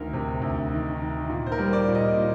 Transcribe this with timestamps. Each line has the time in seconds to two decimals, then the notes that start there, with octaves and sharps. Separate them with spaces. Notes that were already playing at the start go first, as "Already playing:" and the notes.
Already playing: D2 D#3 A#4
0.13 C3
0.42 D2
0.72 D#3
1.00 D#3
1.29 A#2
1.46 C5
1.52 A#4
1.59 G3
1.73 D5
1.88 A#2
1.95 D#5
2.18 A#2